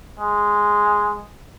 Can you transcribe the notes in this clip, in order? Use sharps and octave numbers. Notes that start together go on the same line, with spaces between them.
G#3